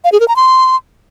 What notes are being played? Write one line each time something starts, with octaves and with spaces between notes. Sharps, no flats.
F5
G#4
A#4
A#5
C6